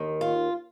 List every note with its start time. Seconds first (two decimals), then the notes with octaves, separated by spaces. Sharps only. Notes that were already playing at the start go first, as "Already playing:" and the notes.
Already playing: D#2 D#3
0.21 F4